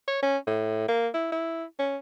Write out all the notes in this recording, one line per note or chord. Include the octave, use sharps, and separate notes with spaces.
C#5
C#4
A2
A#3
E4
E4
C#4